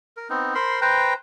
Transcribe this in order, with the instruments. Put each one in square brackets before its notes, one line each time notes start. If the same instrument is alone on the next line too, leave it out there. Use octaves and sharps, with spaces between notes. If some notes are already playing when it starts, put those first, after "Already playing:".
[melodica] A#4
B3 C4 D#4
A#4 C5 B5 C6
B4 C5 G5 A#5